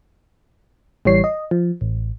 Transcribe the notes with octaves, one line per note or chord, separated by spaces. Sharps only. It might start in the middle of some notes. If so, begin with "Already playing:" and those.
A1 E3 G3 C#5 C7
D#5
F3
A1